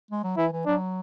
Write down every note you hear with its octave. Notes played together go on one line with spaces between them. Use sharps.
G#3
F#3
E3 E4
E3
F#3 D4